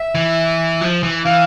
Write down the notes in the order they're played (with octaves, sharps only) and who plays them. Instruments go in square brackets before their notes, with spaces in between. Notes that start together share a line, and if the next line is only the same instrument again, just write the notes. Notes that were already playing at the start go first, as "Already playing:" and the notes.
Already playing: [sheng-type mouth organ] E5
[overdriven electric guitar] E3
F3
E3
[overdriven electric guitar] E3 [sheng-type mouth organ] F5